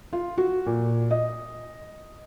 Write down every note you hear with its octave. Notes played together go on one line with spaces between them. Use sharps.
F4
F#4
A#2
D#5